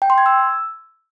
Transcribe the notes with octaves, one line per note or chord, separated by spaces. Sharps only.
G5
C6
G#6
E6